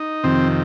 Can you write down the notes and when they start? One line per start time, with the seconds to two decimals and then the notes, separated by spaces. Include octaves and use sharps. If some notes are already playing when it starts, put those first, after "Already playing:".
Already playing: D#4
0.23 F2 C3 D#3 C4